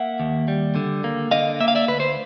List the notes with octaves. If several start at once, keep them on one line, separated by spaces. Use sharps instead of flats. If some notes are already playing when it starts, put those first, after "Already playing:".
Already playing: A#3 E5 F#5
D#2
G3
D3
A#3
D3 D#5 F5
A#3 E5
F5
D5 E5
D2 B4
C5